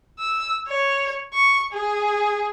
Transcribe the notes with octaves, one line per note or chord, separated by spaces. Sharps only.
E6
C#5
C#6
G#4